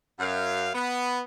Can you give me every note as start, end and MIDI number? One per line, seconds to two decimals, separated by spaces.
0.20 0.70 42
0.20 0.70 77
0.75 1.20 59